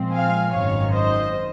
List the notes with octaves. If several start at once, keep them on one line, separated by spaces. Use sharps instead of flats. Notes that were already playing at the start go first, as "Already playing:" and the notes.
Already playing: A#2 F3 G#3 C4
F5 G#5
G#1 F#2 D#3 C#5 F5
C5 D#5